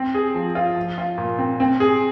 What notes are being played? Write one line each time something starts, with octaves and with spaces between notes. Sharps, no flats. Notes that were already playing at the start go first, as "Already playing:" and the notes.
Already playing: C4
G#4
F3
F4
F3
F4
A#2
C4
C4
G#4